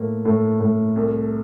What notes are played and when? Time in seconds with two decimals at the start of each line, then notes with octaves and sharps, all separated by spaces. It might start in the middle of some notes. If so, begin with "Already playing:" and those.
Already playing: A2 A#3
0.25 A2
0.60 A2
0.96 C2